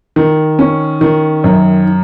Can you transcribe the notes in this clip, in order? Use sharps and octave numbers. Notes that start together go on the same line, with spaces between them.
D#3
C#4
D#3
F#2